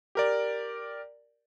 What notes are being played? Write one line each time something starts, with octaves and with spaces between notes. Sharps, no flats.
G4 A#4 D5